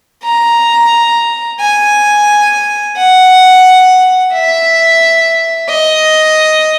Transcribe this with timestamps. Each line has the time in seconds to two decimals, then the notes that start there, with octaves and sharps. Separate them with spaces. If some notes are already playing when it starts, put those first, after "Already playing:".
0.24 A#5
1.60 G#5
2.97 F#5
4.33 E5
5.70 D#5